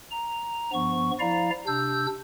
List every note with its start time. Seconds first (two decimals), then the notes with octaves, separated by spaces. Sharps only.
0.11 A#5
0.73 G2 F3 B3 C#6
1.20 F3 E4 D5 F5 A#5
1.67 C3 D4 E6 G6